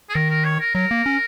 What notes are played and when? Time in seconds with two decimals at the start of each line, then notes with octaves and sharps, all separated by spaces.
0.09 G#4
0.15 D#3 A#4
0.30 A#4
0.44 C#5
0.60 A#4
0.75 F#3 A#4
0.91 A#3
1.06 C#4